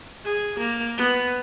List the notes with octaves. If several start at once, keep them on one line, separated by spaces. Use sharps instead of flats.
G#4
A#3
B3